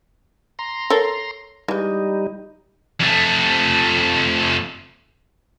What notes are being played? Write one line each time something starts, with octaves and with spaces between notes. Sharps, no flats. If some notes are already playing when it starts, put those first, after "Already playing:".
A#5 C6
A4 A#4 C#5
E3 G3 G#3 D#4
F2 A3